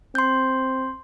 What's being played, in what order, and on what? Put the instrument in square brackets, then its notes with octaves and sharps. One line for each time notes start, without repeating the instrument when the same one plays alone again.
[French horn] C4 [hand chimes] C6 G6